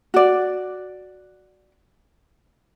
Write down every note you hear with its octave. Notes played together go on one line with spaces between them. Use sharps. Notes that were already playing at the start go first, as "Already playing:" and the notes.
F#4 D5